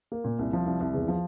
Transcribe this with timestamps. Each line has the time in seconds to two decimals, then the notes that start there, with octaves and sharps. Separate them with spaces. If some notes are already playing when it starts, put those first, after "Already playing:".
0.12 A#3
0.24 A#2
0.39 C2
0.53 F3
0.66 C2
0.80 C2
0.94 E2
1.08 F3